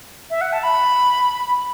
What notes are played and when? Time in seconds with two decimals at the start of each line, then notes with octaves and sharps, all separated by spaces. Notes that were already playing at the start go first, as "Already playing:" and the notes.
0.30 E5
0.41 F#5
0.53 A5
0.63 B5